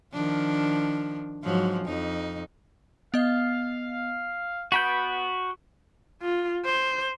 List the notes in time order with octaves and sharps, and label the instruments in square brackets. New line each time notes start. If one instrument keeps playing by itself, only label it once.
[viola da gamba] D#3 F3 D4
G#2 F3 F#3
F2 D#4
[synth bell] B3 D#5 [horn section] F5
[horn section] B3 [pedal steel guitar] F#4 B5 G6 [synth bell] B6 D7
[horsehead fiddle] F4
C5